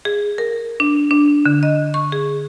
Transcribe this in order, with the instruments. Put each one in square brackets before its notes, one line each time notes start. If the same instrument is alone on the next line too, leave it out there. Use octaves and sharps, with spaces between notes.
[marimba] G#4
A#4
D4
D4
D3
D#5
C#6
G#4